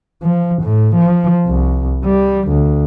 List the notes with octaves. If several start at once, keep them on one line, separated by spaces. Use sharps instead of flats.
F3
A2
F3
C2
G3
D2